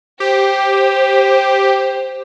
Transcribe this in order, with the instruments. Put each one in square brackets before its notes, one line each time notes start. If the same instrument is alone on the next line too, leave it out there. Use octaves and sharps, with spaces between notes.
[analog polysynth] G4 [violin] C5